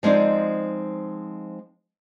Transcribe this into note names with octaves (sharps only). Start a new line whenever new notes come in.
F3 G#3 C4 D#4 D5